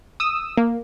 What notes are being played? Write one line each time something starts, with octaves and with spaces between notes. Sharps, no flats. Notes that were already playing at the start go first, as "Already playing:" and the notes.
D#6 E6
A#3